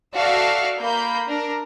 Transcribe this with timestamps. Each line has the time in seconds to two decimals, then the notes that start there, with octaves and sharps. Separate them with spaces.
0.15 F#4 A4 D5 E5 F5 A5
0.78 A#3 B5 G6
1.27 D4 A#4